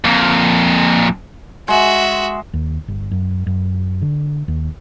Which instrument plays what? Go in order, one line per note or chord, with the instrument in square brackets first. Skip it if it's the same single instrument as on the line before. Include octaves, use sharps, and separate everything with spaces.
[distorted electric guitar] F2 A#2
[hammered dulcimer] G#3 [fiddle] F#4 E5
[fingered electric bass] D#2
G1
F#2
F#2
D3
D#2